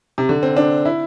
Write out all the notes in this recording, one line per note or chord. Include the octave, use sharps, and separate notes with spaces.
C3
D3
C4
D4
E4